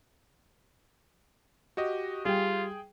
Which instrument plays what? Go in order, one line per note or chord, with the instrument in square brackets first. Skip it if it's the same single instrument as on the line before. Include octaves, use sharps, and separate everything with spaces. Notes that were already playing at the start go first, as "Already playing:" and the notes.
[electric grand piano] F#4 G4 D#5
[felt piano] G3 [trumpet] F4 [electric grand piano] G#4 G5